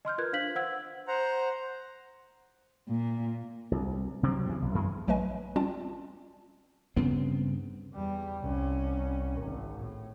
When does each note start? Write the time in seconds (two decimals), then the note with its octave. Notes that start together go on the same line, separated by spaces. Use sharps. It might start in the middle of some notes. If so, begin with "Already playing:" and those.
0.05 D#5 C6 F6 G6
0.18 F4 A#4 B4 F#6 G#6
0.33 D4 C5 F5 G#6 B6 F#7
0.55 C5 F#5 E6 G#6
1.08 C5 F#5 A#5
2.89 A#2
3.71 C2
4.23 C3 F#3 C4
4.46 E2 G2
4.62 B1
4.75 F#2 E3 G#3
5.08 A#1 F#3 A3 B4 D#5 G#5
5.56 G3 C4 C#4 F4 D5 A5
6.96 G2 C#3 B3 C4
7.94 E2 G3
8.43 C2 C#4
9.42 G#1
9.80 A2